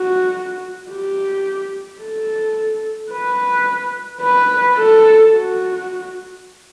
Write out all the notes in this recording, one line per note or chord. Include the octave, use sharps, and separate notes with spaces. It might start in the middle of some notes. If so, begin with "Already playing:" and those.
Already playing: F#4
G4
A4
B4
B4
A4
F#4